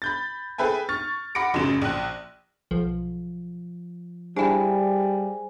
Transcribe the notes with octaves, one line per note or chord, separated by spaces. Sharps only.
B5 G6 A6
G#4 A4 B4 E5 G5 G#5
C#6 F6 A6
F#5 B5 D6 A#6 C#7 D7
A1 F#2 C#3 F#3 E7
A#1 F#6
B1 F3
G3 D4 E4 G#4 C5 G#5